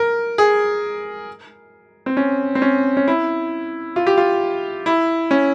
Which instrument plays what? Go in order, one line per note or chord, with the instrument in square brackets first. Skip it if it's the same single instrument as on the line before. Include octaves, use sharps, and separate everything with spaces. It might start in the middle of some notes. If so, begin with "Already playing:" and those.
Already playing: [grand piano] A#4
G#4
C4
C#4
C4
C#4
C#4
E4
F4
G4
F4
E4
C#4